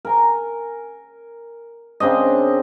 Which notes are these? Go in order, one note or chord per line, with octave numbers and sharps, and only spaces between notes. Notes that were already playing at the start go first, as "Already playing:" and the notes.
A#4 G#5 A#5
C#3 C4 D4 D#5